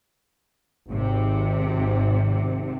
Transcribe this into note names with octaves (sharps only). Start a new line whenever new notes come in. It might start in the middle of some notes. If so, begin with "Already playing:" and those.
G#1 C3